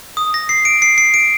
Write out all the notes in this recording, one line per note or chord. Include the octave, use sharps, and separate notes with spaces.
D#6
A#6
C7
D7
C7
C7
D7